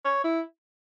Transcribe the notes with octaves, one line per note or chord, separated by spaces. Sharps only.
C#5
E4